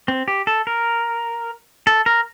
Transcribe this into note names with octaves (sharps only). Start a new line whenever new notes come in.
C4
G4
A4
A#4
A4
A#4